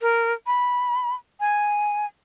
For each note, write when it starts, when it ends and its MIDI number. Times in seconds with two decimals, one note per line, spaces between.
0.01 0.33 70
0.47 1.15 83
1.40 2.06 80